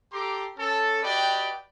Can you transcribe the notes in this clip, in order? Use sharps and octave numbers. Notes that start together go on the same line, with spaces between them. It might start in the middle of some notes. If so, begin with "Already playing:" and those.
G4 A4 A#5 C6 D6
C#4 A4
F#4 G4 B4 D5 D#5 G5